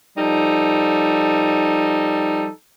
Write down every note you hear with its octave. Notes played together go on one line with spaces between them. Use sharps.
F3 G3 D#4 A4